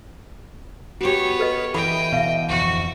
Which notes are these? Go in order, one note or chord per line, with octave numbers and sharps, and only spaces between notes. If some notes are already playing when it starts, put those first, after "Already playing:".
B3 F#4 G4 C#5
A4 B4 D#5
E3 A4 D#5 F#5 G5 B5
B2 E5 F5
D1 F2 F#4